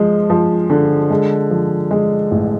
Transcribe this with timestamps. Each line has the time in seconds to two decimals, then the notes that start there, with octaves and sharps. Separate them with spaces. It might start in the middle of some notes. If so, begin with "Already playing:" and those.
Already playing: F3 G#3
0.30 F3
0.70 D3
1.10 G#3
1.51 F3
1.91 G#3
2.32 A1